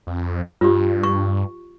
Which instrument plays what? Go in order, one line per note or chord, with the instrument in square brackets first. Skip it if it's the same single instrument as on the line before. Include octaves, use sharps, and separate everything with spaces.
[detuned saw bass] F2
[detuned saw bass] G2 [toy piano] F4 G4
[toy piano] C#6